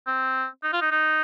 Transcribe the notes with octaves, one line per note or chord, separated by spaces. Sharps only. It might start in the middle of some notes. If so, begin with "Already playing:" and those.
C4
D#4
F4
D#4
D#4